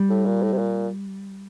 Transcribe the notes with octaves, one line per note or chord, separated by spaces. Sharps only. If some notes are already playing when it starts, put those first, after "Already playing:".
Already playing: G3
A2
A#2
A2
C3
A#2